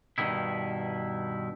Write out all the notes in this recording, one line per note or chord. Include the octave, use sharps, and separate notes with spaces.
G2 B2 D#3 E4